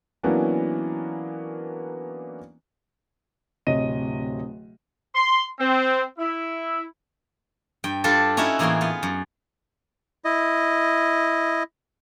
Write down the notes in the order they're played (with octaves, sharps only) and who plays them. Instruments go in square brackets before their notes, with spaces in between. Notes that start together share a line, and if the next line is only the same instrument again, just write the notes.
[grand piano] E3 F#3 A#3 B3 C#4 D4
D1 C3 C#5 D#5 D#7
[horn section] C6
C4
E4
[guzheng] G2 G5
G3 D4 F4 A4 C5 D5
C#4 D#4 E4 F#4 E5 F#5
A2 E3 A#3 G#4 G5 C6
B3 F4
F#2
[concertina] E4 D#5